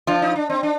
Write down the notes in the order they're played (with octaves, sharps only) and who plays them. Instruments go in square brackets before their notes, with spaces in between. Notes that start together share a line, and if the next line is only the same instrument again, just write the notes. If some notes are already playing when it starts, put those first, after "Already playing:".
[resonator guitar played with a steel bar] F3 F4 [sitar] D4
[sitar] D#4
D4
C4
D4